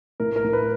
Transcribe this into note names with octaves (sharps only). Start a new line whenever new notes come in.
A2 A#4
A#4
A2
B4